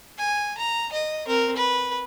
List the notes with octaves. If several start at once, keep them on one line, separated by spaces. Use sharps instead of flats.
G#5
A#5
D#5
C4 A#4
B4